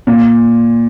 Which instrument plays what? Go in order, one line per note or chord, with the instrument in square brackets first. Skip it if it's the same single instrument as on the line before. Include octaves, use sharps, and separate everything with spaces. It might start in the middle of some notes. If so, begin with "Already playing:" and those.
[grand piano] A#2